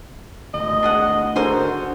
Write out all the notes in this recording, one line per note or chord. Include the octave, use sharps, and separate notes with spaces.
G#1 D2 D#5
D4 G#4 F#5
D3 F#4 G#4 A#4 C5